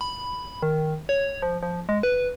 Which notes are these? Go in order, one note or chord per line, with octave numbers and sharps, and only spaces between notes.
B5
D#3
C#5
F3
F3
G#3
B4